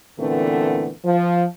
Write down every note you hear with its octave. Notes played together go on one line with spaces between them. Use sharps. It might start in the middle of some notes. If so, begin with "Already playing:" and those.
A#2 D3 E3 A3 B3 C4
F3